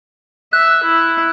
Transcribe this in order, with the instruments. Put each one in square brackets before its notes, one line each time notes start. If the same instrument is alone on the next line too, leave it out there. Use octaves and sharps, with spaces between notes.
[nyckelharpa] E5 [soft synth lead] F#6
[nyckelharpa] E4